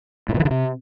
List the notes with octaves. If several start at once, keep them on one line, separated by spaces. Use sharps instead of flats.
A2
A#2
E3
D3
C3